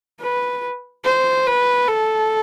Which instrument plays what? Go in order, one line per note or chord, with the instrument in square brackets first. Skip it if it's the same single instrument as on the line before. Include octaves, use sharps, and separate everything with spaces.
[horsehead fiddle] B4
C5
B4
A4